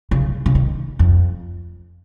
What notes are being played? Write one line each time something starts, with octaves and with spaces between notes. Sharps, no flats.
C#3
C#3
D#3
F2